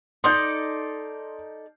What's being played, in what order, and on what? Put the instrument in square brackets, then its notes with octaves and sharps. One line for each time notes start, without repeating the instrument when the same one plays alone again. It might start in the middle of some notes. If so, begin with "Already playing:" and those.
[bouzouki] D#4 A4 D5 [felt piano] C6 G6